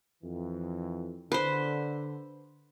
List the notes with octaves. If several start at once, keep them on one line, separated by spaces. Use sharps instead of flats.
F2 E3
D3 B4 C5